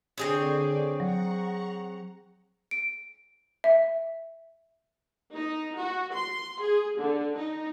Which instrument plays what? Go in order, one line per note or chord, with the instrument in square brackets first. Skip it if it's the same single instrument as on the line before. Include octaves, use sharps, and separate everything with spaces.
[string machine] D3 D5 [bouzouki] C4 G#4 C#5
[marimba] F#3 [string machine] F#5 A#5 C#6
[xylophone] D7
E5
[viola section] D#4
F#4
C6
G#4
D3
D#4